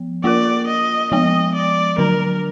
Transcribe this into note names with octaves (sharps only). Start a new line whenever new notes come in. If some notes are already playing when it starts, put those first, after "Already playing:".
Already playing: F3 B3
A#3 F4 A#4 D5
D#5
F3 G#3 B3 D#5
D5
D3 F#3 D4 A#4